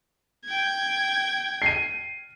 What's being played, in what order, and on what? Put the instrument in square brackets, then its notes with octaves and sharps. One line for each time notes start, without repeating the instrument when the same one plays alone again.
[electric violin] G5 G#6
[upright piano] C7 D#7